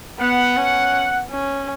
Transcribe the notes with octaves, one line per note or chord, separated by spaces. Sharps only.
B3 F#5
C#4
C#4